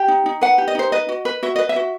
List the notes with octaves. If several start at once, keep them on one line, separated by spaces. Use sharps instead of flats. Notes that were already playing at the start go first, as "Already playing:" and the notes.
Already playing: G4 G5
D#4
D#4
B4 F#5
G4
D#5
D#4 C5
B4 D#5
F#4
B4
F#4 E5
B4 D#5
E5
F#4